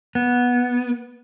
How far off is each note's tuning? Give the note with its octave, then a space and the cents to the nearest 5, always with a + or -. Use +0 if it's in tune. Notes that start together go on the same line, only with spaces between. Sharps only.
B3 -10